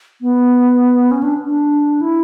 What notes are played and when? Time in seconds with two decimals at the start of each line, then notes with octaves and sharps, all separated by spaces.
0.22 B3
1.11 C#4
1.23 D4
1.45 D4
2.01 E4